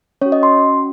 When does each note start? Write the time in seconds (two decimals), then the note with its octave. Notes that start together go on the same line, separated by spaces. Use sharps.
0.21 C#4 C#5
0.26 F#4
0.32 D#5
0.43 C6